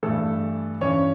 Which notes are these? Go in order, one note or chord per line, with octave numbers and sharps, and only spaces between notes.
G2 E3 A3 A4
G2 E3 C#4 C#5